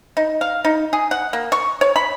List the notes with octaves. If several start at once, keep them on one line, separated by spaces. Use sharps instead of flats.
D#4
F5
D#4
G#4
F#5
A#3
C#6
C#5
B5